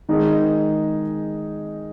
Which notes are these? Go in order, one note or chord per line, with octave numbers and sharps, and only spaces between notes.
D#3 G#3 D#4 G#4